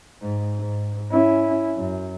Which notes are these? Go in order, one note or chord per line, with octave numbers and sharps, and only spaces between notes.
G#2
G#2
C#4 E4
F#2